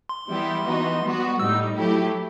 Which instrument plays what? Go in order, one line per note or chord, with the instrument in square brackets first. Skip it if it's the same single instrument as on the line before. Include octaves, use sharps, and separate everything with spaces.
[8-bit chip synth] C6
[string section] E3 G3 B3 E4 G4
E3 B3 D#4 F#4
G3 B3 F#4
[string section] A2 G3 D#4 [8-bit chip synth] E6
[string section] F#3 A3 E4 G4